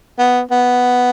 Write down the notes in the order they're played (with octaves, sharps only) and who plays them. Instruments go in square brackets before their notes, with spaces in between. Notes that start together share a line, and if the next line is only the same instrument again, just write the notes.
[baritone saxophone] B3
B3